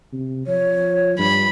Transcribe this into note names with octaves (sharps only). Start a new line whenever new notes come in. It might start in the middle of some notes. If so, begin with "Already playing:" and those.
C3
F3 C#5
G2 B5